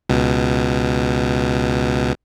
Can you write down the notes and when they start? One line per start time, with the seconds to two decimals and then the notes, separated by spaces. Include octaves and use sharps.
0.09 C#2 B2